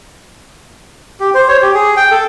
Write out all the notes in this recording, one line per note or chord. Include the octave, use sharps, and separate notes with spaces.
G4
C5
C#5
G4
G#4
G5
A4